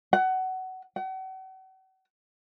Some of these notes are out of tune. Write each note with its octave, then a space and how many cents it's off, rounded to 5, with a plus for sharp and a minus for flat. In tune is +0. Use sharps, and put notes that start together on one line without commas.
F#5 +20
F#5 +40